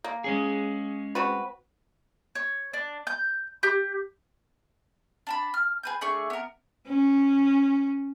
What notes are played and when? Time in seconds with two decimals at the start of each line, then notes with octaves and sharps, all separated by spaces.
0.04 A#3
0.24 G#3 C#4 G#4
1.15 C4 F#4 B4
2.35 C#5
2.73 D4
3.07 G6
3.63 G4
5.27 D4 A5 B5
5.54 F6
5.83 G#4 B4 G6
6.01 A3 D4 G#4 C#6
6.30 B3 A#4
6.87 C#4